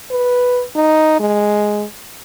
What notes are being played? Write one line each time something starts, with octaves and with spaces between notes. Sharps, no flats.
B4
D#4
G#3